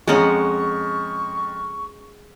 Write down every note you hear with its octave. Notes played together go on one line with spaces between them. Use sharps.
F2 G#3 C#4 F#5 A#5 C#6